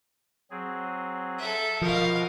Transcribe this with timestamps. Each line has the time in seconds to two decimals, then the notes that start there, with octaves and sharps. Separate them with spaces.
0.51 F#3 C4 G#4
1.38 A4 E5
1.82 B2 F3 A#4 C5 D#5 F5